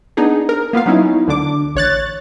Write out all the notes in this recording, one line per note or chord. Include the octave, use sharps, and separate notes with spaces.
B3 D4 D#4 G#4
A#4
A#3 B3 F4 F5
F#3 B3 C#4 D#4 E4
D2 D3 D4 D6
A1 C#5 F#6 A6